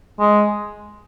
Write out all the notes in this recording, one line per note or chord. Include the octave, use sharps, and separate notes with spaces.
G#3